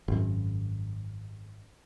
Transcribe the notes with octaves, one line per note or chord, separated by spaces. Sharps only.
G#1 F#2